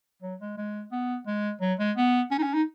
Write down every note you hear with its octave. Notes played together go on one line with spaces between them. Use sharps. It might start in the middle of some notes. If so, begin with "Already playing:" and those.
F#3
G#3
G#3
B3
G#3
F#3
G#3
B3
C#4
D#4
C#4
D#4